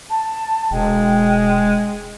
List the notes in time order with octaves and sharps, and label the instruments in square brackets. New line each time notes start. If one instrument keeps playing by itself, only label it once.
[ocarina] A5
[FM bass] E1 [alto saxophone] G#3 [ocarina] G5